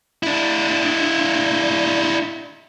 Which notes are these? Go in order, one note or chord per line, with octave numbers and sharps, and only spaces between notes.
D4 E4